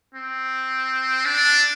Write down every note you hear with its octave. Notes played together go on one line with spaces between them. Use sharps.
C4
D4